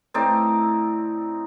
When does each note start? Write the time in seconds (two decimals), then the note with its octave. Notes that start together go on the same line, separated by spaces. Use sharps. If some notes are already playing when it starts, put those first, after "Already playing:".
0.14 A2 C4 D#4 D5